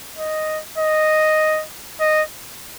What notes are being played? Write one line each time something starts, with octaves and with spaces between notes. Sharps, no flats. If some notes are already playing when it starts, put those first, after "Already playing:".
D#5
D#5
D#5